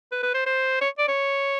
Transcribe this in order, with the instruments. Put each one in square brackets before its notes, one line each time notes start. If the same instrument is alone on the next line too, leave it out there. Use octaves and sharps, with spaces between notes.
[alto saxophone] B4
B4
C5
C5
C#5
D5
C#5